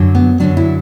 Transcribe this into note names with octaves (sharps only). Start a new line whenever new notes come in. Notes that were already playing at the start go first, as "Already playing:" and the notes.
Already playing: F#2 D3 F#3
B3
F#2 D3 F#3 D4
E4